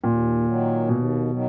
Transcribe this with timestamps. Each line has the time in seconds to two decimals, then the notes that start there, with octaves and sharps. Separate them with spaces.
0.03 D#2 A#2
0.46 D#3 F#3
0.89 D#2 B2
1.31 D#3 F#3